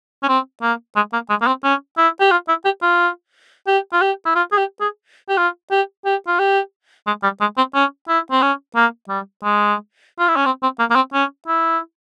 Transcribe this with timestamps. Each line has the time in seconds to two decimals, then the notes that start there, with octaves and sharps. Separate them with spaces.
0.23 C#4
0.28 C4
0.62 A#3
0.96 G#3
1.13 A#3
1.30 G#3
1.42 A#3
1.47 C4
1.64 C#4
1.98 E4
2.20 G4
2.31 F4
2.49 E4
2.65 G4
2.82 F4
3.68 G4
3.93 F4
4.01 G4
4.26 E4
4.35 F4
4.52 G#4
4.58 G4
4.81 G#4
5.29 G4
5.37 F4
5.71 G4
6.05 G4
6.27 F4
6.39 G4
7.07 G#3
7.23 G3
7.41 G#3
7.57 C4
7.74 C#4
8.09 E4
8.31 C4
8.42 C#4
8.76 A#3
9.09 G3
9.44 G#3
10.19 F4
10.28 E4
10.36 C#4
10.46 C4
10.63 C4
10.79 A#3
10.91 A#3
10.96 C4
11.14 C#4
11.48 E4